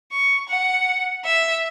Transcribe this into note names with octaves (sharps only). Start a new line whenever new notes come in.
C#6
F#5
E5